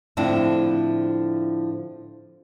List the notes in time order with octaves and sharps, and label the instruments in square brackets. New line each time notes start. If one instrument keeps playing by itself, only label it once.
[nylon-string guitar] A2 D3 F3 C4 D4 E4